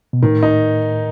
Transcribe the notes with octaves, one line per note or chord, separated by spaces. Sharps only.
B2
A2 D#3
D#4